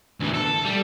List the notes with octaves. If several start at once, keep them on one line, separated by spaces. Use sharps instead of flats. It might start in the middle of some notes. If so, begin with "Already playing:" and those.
D2 E3
A4
G3